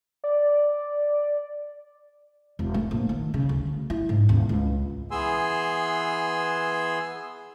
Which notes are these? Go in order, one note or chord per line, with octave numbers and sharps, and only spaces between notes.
D5
E1
A3
A#1
D#3
C#3
D2
E4
G#2
D#1
C#2
E3 B3 G#4 G#5 C6 E6